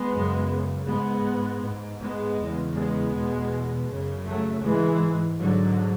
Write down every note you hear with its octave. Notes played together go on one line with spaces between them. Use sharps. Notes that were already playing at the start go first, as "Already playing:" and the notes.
Already playing: G#3 B3
F#2 C#3
G#2 G#3 B3
G#2
G#3 B3
E2 C#3
G#3 B3
E2 B2
F#2 C#3
F#3 A3
G#2 E3 G#3
G#2 D3 F#3